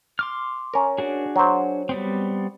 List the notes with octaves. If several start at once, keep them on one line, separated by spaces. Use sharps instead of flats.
C6 D6 F6
C#4 A#4
D4 F#4 G#4
F#3 C5
G3 B3 C4